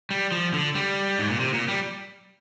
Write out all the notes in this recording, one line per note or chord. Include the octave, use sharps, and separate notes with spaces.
G3
F3
D3
G3
G#2
A#2
C3
A#2
G3